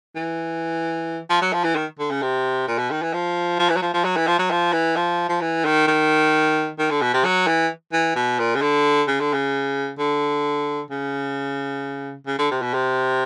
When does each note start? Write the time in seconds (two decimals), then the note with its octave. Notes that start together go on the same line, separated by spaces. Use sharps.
0.16 E3
1.30 F3
1.42 F#3
1.53 F3
1.64 E3
1.75 D#3
1.99 D3
2.11 C#3
2.22 C3
2.68 A#2
2.78 B2
2.91 D#3
3.02 E3
3.13 F3
3.59 F3
3.70 E3
3.76 F#3
3.82 F3
3.94 F3
4.04 F#3
4.16 E3
4.27 F3
4.39 F#3
4.51 F3
4.73 E3
4.96 F3
5.29 F3
5.41 E3
5.65 D#3
5.88 D#3
6.79 D#3
6.91 D3
7.02 B2
7.14 C3
7.25 F#3
7.47 E3
7.93 E3
8.16 B2
8.39 A#2
8.56 C#3
8.61 D3
9.08 C#3
9.20 D3
9.33 C#3
9.99 D3
10.91 C#3
12.27 C#3
12.39 D3
12.51 C3
12.62 B2
12.73 C3